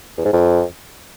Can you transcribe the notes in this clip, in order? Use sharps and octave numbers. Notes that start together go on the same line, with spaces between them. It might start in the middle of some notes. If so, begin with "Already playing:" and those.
E2
G#2
F2